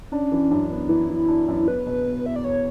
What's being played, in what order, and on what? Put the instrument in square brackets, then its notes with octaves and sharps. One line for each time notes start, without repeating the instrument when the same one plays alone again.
[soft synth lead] C#4 [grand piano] D4
[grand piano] E3
[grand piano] F#2 [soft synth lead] D4
[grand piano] B3
[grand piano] E3 [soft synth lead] E4
[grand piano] E3
D4
F#2
[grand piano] E2 [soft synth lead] B4
[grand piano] B2
B2
[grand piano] E2 [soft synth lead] E5
[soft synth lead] D5
[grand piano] E2 [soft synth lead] C#5